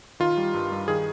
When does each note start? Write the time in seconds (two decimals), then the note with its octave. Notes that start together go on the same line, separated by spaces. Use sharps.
0.20 D#3 F4
0.37 G3
0.54 G2
0.72 G2
0.88 D#3 G#4